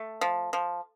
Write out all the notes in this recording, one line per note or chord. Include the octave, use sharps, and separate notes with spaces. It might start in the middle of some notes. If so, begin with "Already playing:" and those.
Already playing: A3
F3
F3